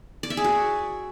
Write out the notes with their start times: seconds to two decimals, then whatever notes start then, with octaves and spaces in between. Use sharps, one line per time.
0.23 D5
0.30 E5
0.37 G#4
0.44 F#4